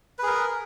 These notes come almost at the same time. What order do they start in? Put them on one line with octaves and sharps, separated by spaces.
B4 G#4 A#4